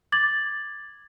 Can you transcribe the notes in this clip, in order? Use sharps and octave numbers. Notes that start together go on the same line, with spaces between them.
D6 G#6 A6 F#7